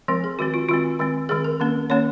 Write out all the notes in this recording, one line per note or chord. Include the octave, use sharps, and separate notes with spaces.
F3 G#3 C4 A#4
G#4
D#3 G#3 C4 F#4
F4
D#3 G#3 C4 F4
D#3 G#3 C4
D#3 G#3 C4 G#4
A#4
D#3 A#3 C#4
D#3 A#3 C#4 C#5